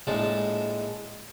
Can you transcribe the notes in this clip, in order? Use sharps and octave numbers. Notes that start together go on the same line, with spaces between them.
A#1 A2 G#3 A5